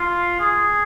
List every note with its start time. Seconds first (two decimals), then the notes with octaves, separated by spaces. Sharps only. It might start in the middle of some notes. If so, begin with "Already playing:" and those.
Already playing: F4
0.40 G#4